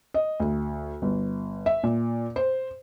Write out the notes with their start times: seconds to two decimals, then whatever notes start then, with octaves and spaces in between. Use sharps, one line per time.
0.14 D#5
0.40 D2
1.02 G1
1.66 E5
1.84 A#2
2.36 C5